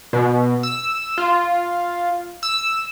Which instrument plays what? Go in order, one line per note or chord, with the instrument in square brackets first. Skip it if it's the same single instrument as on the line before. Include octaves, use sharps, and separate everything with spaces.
[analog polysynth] B2
E6
F4
E6